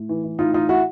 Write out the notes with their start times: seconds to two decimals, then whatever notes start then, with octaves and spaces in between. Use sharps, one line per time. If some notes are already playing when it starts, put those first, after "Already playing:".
Already playing: A2
0.09 E3
0.24 E3
0.39 A2 D#4 F4
0.54 E3 D#4 F4
0.69 E4 F#4